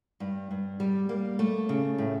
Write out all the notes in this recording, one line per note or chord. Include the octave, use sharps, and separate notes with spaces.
G2
G2
G3
A#3
A3
C#3
A2